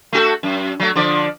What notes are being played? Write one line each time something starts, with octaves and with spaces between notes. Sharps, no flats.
A3 F#4 A4
F#2
F#3 A3
D3 F3 D5